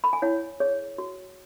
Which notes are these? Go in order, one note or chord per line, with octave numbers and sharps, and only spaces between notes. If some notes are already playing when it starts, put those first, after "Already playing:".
B5
G#5
E4 C#5 F#5
G#4 C#5
F#4